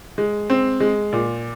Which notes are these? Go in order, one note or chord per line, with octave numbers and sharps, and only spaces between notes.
G#3
C4
G#3
A#2